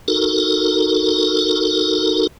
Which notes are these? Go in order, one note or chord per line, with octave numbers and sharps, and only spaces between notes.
D#4 F#4 A4 A#4